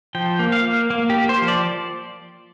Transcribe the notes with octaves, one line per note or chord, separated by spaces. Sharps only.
F3 G5
A#3
F5
A#3
A#3
G4
A#3
C5
F3
D5